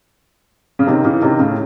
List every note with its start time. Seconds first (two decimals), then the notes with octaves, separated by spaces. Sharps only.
0.79 C#3
0.87 C3 D#3
1.04 C#3 E3
1.22 C3 D#3
1.39 A2 C#3